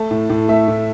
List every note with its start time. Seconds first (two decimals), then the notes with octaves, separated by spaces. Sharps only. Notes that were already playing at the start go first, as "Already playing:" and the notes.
Already playing: A3 A5
0.11 A2
0.30 A2
0.48 A3 E5
0.68 A2